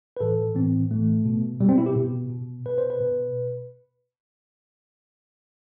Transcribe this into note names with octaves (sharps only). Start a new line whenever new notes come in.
B4
A2 E3 A4
A2 E3 C4
A2 E3 A3
B2
B2 G3
C4
E4
G4
B2
B2
B2 B4
C5
B4
B2